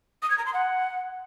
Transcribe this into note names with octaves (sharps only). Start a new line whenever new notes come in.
D#6
G#6
A#5
C6
F#5